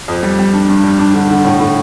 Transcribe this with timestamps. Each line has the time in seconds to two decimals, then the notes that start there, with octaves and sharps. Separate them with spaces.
0.08 F2
0.23 G3
0.39 G3
0.53 D4
0.69 G2
0.83 G3
0.99 D4
1.14 D3
1.30 D3
1.45 A2
1.60 A2